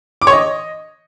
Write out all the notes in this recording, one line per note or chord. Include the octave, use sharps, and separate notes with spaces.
D6
C#5
D#5